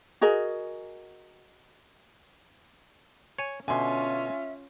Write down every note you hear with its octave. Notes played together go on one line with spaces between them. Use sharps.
F#4 G#4 A#4 D#5
C#5 G#5
B2 D3 C#4 F4 E5 G#5 C6